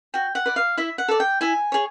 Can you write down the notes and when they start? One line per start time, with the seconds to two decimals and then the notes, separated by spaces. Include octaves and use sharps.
0.14 F#4 G5
0.35 F#5
0.46 B4 D5
0.56 F5
0.77 E4 E5
0.98 F#5
1.08 A4 D5
1.20 G5
1.41 E4 G#5
1.72 G#4 C#5